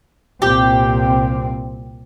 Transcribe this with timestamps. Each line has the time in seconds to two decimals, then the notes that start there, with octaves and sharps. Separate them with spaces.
0.42 C2 A#2 C4 G4